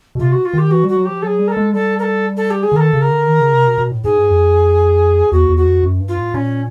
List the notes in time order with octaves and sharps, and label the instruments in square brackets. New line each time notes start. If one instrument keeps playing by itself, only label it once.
[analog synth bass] B2
[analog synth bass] C3 [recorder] F4
[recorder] F#4
F4
[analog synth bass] D#3 [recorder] G4
[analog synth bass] E3 [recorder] F#4
[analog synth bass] G3
[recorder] F#4
[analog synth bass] F#3
[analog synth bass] F3 [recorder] G4
[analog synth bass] F#3 [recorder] G#4 A4
[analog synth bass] G3
[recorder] A#4
A4
[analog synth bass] G#3
[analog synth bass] G3 [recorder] A4
[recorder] A#4
A4
A4
G4
G#4
[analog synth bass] D3
[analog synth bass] D#3 [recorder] A#4
[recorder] A4
[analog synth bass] C#3
[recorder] A#4
[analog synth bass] D3
D#3
C#3
C3
B2
B2
A2
[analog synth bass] G#2 [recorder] G#4
[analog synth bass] G2
F2
[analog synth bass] E2 [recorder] F#4
[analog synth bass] E2
[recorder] F#4
[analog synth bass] F2
F#2
G2
[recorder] F4
[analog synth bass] A2
[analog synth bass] A#2 [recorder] C#4